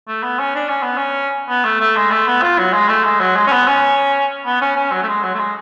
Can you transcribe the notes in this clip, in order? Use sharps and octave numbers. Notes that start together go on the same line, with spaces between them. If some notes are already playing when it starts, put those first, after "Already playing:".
A3
B3
C#4
D4
C#4
B3
C#4
B3
A3
A3
G#3
A3
B3
F4
F#3
G#3
A3
G#3
F#3
G#3
C#4
B3
C#4
B3
C#4
C#4
F#3
A3
G#3
F#3
A3
G#3